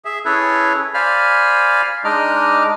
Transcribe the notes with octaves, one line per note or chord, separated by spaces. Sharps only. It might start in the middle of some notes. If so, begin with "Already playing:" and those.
G#4 E5
C#4 E4 G#4 A4 B4 C#5
C5 D5 F5 G#5 B5 F6
G#3 D4 D#4 D#5 D6 F6